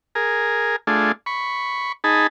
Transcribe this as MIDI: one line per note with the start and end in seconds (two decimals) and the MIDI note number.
0.15 0.76 68
0.15 0.76 70
0.87 1.12 57
0.87 1.12 62
0.87 1.12 65
0.87 1.12 68
1.26 1.92 83
1.26 1.92 85
2.04 2.27 63
2.04 2.27 68
2.04 2.27 81
2.04 2.27 83